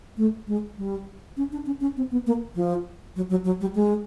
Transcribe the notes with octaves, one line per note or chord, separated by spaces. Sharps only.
A3
G#3
G3
C#4
D4
C#4
C#4
C4
B3
A#3
F3
F#3
F#3
F#3
G3
G#3